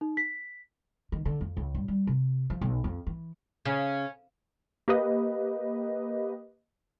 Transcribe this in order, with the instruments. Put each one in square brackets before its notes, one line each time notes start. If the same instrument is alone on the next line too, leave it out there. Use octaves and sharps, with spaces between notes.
[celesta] D#4
B6
[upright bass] D#3
D3
F2
C#2
G2
G3
C3
F3
B1
F2
E3
[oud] C#3 [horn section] C#4
[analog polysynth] A#3 G4 B4 D#5